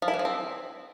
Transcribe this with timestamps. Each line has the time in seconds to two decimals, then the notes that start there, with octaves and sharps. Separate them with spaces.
0.02 F3
0.08 E4
0.14 E3
0.19 F3
0.25 C4